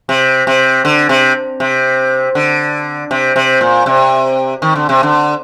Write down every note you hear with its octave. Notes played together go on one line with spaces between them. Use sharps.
C3
C3
D3
C3
C3
D3
C3
C3
A#2
C3
D#3
D3
C3
D3